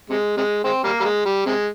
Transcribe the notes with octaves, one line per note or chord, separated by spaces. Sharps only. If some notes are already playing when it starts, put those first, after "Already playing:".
C3 G#3
C3 G#3
G#3 C4
G3 A#3
G3
G#3
G3
C3 G#3